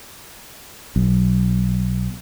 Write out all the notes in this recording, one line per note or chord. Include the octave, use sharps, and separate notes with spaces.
B1